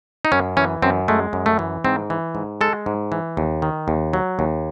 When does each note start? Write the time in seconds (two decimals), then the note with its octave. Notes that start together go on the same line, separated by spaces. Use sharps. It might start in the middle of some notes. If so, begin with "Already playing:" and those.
0.25 D#4
0.32 F#2 C#4
0.57 E3 C#4
0.82 F#2 C4
1.08 G#3 A3
1.33 F#2
1.46 A3
1.59 E3
1.85 G#2 C4
2.10 E3
2.35 G#2
2.61 G#3 A4
2.86 G#2
3.12 E3
3.37 D#2
3.62 D#3
3.88 D#2
4.13 F#3
4.39 D#2